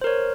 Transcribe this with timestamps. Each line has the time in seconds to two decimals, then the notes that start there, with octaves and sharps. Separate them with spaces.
0.01 C5
0.04 A#4
0.07 C#5